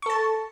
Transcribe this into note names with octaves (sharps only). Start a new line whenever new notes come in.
A4 A5 C#6